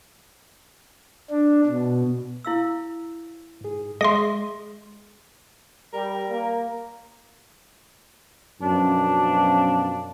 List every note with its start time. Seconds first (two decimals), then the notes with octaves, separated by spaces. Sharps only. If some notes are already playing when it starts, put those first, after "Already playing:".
1.30 D4
1.66 B2
2.45 E4 F5 E6
3.61 G#2 G#4
4.01 G#3 G#4 D#5 E5 C6
5.93 G3 A#4
6.29 A#3
8.62 F#2 B2 F3 D4